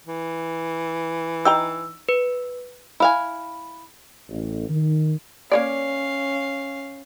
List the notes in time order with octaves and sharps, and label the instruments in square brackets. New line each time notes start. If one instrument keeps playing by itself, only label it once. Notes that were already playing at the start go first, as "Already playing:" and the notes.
[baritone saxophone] E3
[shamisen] D#4 G5 A#5 [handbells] E6
[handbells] B4
[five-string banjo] E4 F5 G#5
[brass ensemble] A1
D#3
[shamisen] A#3 C#5 D5 [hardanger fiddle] C#4 F5